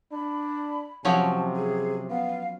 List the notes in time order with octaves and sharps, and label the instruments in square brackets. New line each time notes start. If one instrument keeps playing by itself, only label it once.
[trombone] D4 [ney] B5
[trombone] C3 [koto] F3 F#3 C#4 [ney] A5
[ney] G#4
[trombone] B3 [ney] F5